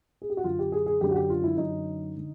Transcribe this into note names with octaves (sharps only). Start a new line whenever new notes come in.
G#4
G4
F#4
F#2 D3 F4
G4
G#4
G#4
F#2 D3 G4
F#4
G4
F4
E4
F#2 D3 D#4
D3